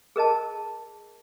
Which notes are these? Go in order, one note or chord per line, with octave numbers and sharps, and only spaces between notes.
G#4 A#4 D#5 A5